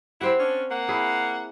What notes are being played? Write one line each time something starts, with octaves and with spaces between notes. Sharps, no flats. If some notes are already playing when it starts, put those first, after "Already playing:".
C4 E4 G4 C5 F#5
C#4 D4
A#3 F#5
E4 G#4